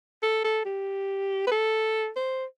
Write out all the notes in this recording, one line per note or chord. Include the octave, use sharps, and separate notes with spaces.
A4
A4
G4
B4
A4
C5